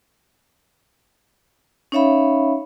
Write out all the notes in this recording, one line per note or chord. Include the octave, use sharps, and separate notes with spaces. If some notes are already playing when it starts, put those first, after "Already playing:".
C#4 D#4 C#5 E5 F5 B5